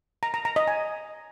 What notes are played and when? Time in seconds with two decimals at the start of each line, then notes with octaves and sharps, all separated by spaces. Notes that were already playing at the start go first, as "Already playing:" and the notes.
0.23 A#5
0.34 A#5
0.45 A#5
0.56 D#5
0.67 G#5